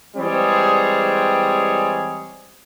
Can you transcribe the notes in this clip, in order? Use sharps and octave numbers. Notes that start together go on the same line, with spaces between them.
E3 G3 G#3 C4 G#4 C#5